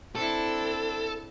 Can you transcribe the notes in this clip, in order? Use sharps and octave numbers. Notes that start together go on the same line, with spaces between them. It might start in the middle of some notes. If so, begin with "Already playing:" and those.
C4 D4 E4 A4